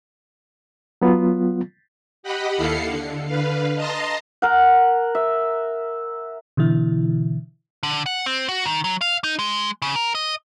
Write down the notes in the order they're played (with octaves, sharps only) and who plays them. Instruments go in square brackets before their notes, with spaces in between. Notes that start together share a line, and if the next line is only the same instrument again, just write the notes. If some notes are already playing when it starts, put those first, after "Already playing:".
[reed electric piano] F#3 B3 F4
[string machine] G4 D#5 F#5 B5
D#2 E4 A4 F5 C7 C#7
D3
D3 B4 F5
D#5 A5 A#5 C6 A#6
[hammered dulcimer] A#4 F#5
E5
[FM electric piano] B2 D3 E3 E4
[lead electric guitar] D3
F#5
C4
F#4
D#3
F#3
F5
D#4
G#3
C#3
A#4
D#5